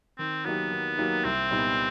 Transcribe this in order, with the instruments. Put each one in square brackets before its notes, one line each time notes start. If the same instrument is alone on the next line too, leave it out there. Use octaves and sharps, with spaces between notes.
[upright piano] D#3 [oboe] C4
[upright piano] F#3 A#3 D#4 G4 [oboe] B3
[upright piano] D#3
F#3 A#3 D#4 G4
[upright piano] C2 [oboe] C4
[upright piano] A#2 G3 B3 D#4